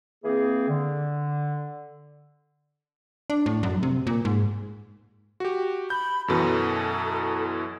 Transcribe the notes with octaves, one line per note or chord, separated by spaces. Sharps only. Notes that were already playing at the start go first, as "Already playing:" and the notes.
E3 A#3 C4 G#4
D3
D4
A2
F#2
C3
A#2
G#2
F#4 G4
B5 G6
F#2 B2 E3 A4